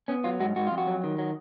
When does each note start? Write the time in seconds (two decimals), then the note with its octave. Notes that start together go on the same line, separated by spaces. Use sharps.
0.08 B3 C#4
0.24 F#3 F4
0.40 G#2 F#4
0.56 G#2 F#4
0.67 F2 F4
0.78 F#4
0.87 F#3
1.04 D#3
1.18 F#3